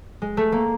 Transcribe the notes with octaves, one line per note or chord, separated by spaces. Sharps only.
G#3
A3
A#3